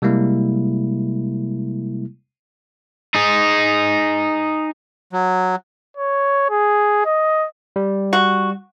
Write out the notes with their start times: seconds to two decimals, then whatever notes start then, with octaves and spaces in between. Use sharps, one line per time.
0.02 C3 G3 G#3 A#3 E4
3.15 D#4 G#4
5.13 F#3
5.97 C#5
6.50 G#4
7.06 D#5
7.76 G3
8.13 F#4